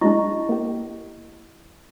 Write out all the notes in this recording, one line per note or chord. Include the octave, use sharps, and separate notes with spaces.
F#3 G#3 D4 E4 D#5 C#6
A#3 G4